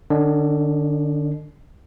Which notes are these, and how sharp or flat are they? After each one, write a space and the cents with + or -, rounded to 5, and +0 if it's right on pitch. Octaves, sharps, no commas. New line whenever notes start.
D3 +35 D4 -40 D#5 -40